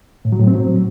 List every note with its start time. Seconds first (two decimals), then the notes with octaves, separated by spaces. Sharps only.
0.25 A2
0.32 F#3
0.40 A2
0.47 C4
0.55 F#3